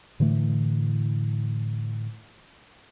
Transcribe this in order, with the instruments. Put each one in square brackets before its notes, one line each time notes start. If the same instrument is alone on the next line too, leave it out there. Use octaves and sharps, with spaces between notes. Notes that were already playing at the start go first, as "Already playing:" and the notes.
[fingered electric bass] A2 D3 E3 A3